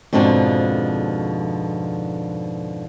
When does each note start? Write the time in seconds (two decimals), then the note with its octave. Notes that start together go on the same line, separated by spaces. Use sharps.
0.13 F2 G#2 B2 D3 F3 D4